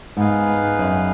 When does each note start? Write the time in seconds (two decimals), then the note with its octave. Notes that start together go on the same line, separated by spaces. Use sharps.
0.16 G#2 B3 D#4 G#4 B4 F5
0.79 F#2